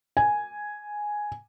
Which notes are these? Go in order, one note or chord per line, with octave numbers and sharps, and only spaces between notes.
G#5